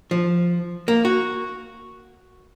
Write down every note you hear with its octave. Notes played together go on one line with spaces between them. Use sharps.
F3
A#3
F#4